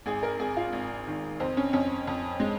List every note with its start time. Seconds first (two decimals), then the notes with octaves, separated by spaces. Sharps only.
0.06 G#1 G#4
0.23 A#4
0.39 G#1 G#4
0.57 F4
0.73 G#1
1.07 D#3
1.40 F2 C4
1.57 C#4
1.73 F2 C#4
2.07 F2
2.40 G#3